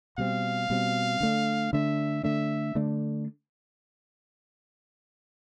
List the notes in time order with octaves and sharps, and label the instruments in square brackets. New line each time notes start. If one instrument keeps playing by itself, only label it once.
[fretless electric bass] B2 G3 C4 [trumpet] F5
[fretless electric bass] B2 G3 C4
D3 A3 D4
[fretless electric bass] D3 A3 D4 [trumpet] E5
[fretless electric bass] D3 A3 D4 [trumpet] E5
[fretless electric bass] D3 A3 D4